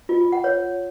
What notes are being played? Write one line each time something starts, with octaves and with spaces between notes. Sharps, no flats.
F4
F4
F#5
C#5